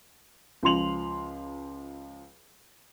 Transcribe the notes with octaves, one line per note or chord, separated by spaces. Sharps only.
C#2 F3 C6 F7 F#7